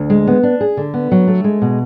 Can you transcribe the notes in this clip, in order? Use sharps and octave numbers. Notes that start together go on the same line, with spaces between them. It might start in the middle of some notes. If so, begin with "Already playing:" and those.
Already playing: D2
G#3
B3
D4
G#4
D3
B3
F#3
A3
G#3
B2